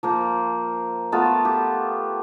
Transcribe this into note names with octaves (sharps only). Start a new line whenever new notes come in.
F3 A#3 C5
A3 B3 F4 A5
G4